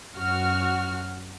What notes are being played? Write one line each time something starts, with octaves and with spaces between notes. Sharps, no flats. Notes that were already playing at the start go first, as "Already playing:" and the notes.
F#2 F#4 F6